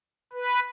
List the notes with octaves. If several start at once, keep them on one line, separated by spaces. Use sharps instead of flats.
B4